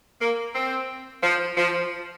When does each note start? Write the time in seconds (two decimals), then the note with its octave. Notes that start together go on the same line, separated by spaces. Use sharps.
0.21 A#3
0.55 C4
1.23 F3
1.57 F3